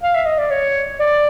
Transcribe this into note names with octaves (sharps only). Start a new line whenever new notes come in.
F5
E5
D#5
D5
C#5
D5